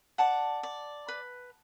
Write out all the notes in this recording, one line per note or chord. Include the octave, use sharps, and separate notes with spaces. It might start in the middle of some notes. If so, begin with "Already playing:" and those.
D5 F#5 A5
D5
B4